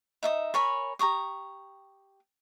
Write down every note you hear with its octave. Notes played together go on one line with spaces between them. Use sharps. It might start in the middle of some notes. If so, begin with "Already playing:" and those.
D#4 E5 D#6
A#4 C#5 G#5 B5
G4 A#5 C#6 D#6